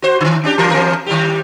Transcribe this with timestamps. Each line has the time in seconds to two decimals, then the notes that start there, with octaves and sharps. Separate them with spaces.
0.02 F#4 C5
0.21 D3 D#3
0.44 C#4 D4 G4
0.58 E3 F4 A#4
0.71 E3 C4 A#4
1.06 D#3 G3 G4